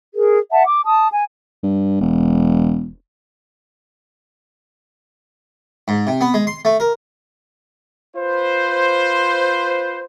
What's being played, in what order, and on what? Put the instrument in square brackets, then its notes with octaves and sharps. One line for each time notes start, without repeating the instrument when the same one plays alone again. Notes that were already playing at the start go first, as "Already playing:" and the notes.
[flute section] G#4 A#4
E5 F#5 A5
D6
A5 D#6
G#5
[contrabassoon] G2
E1
[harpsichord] G#2
C3
B3
G#3
C6
A3
A#4
[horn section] F4 B4 C5